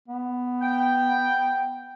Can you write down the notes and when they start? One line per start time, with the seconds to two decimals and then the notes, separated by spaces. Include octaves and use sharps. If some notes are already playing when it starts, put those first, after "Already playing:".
0.09 B3
0.62 G5